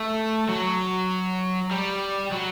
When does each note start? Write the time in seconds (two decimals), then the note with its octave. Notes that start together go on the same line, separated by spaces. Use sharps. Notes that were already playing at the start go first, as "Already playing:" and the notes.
Already playing: A3
0.49 F#3
1.71 G3
2.32 F#3